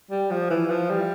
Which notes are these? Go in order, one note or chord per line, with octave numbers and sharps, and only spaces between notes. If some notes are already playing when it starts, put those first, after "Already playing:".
G3
F3
E3
F3
G3